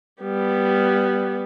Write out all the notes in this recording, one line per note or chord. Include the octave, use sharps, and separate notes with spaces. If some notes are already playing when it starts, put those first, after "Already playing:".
G3 B3